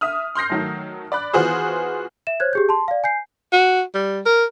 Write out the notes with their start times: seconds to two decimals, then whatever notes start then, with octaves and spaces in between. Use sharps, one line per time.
0.01 E5 D#6 F6
0.35 C6 F6 G6 A#6 C7
0.50 D#3 F#3 A3
1.12 D5 B5 F#6
1.33 E3 B3 F4 F#4 G#4 C5
2.27 E5 E7
2.40 C5 C#5 F#6 G#6
2.53 G4 G#4 G6
2.69 A5 C6
2.88 D5 F5
3.04 G#5 G6 C7
3.53 F#4
3.95 G3
4.26 A#4